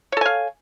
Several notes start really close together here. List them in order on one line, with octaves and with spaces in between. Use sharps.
C#5 A4 G#5 F5